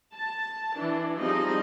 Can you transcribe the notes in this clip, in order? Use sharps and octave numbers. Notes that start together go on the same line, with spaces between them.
A5
E3 D4
F3 G3 C4 D#4 G#4 D#5